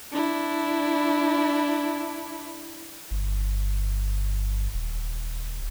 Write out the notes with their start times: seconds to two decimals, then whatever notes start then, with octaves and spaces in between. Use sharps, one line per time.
0.12 D4 E4
3.11 G1
4.74 D#1